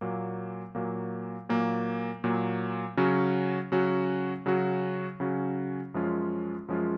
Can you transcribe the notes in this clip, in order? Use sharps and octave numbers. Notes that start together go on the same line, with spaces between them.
A#2 F#3 A#3
A#2 F#3 A#3
A#2 F#3 A#3
A#2 F#3 A#3
C#3 F#3 C#4 F#4
C#3 F#3 C#4 F#4
C#3 F#3 C#4 F#4
C#3 F#3 C#4 F#4
F#2 F3 G#3 C#4 F4
F#2 F3 G#3 C#4 F4